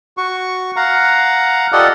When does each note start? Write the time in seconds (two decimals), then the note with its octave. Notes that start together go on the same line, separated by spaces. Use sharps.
0.17 F#4 C#6
0.76 F5 F#5 A#5
1.72 F4 G4 A4 D5 D#5 F#5